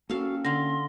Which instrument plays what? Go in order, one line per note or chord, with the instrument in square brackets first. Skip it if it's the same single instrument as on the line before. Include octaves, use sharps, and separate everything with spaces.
[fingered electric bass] A#3 B3 C#4 [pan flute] F#4 [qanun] A4 F5
[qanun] D3 F5 [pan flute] C6 [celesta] A#6